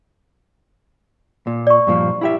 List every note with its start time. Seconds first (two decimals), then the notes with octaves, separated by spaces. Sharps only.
1.47 A#2
1.67 D5 C#6
1.87 G2 A#2 F3
2.21 E4 G4 E5